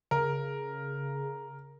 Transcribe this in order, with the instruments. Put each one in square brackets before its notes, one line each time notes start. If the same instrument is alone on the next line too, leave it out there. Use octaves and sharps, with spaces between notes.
[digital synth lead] C#3 [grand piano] A#4